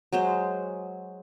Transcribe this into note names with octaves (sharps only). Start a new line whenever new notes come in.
F#3 G#3 C5